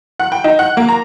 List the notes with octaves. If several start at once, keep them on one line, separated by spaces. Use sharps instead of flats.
F#5
G5
D#4
F#5
A#3
A#5